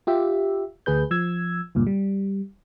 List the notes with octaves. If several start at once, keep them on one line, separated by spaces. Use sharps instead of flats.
F4 G4 E5
D2 G#4 B4 G6
F3 E6 G#6
C#2 G2 A#2
G3